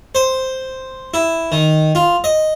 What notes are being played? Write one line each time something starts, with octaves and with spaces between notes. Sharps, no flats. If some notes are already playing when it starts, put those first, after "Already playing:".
C5
E4
D#3
F4
D#5